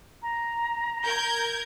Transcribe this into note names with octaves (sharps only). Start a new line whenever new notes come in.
A#5
A#4 G6 G#6